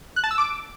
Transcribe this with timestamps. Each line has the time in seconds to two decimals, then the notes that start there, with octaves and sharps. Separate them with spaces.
0.16 F#6
0.24 A5
0.31 E6
0.38 D6